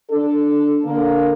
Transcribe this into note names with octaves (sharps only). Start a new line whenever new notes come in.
D4 A4
D3 A#3